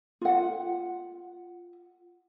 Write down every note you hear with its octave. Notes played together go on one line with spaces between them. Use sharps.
F4 F#5